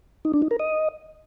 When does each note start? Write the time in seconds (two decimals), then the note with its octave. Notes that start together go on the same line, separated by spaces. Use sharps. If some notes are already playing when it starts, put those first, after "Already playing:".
0.25 D#4
0.33 D4
0.42 D#4
0.51 A#4
0.59 D#5